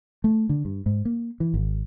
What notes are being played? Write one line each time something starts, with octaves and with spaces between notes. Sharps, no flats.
A3
D3
G2
G#2
A#3
E3
G#1